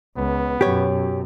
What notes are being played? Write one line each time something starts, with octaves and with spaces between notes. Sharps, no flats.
C#2 B3
F#2 B2 G4 C#5